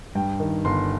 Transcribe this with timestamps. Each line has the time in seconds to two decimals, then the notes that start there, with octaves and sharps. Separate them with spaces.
0.15 G2 G5
0.40 D#3
0.65 G1 C6